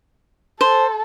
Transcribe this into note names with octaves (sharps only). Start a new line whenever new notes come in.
A4 C5